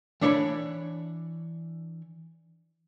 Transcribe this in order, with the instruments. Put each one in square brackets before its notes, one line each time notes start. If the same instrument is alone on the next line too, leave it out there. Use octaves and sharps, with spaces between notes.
[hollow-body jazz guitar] E3 D4 C#5 D5 B5